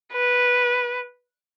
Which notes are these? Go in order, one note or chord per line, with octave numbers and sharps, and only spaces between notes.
B4